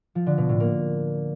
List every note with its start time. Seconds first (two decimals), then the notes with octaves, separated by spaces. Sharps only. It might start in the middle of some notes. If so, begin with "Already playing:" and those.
0.15 F3
0.26 D3
0.38 B2
0.49 A2
0.60 A#3